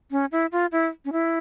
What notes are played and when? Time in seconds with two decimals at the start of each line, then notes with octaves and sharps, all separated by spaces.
0.11 C#4
0.32 E4
0.52 F4
0.72 E4
1.05 C#4
1.12 E4